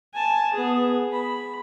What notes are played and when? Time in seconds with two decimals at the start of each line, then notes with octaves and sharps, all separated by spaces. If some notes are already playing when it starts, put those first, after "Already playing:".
0.14 G#5 A5
0.53 B3 G#4
1.13 B5